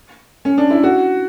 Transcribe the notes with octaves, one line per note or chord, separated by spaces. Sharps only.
C#4
D4
E4
F#4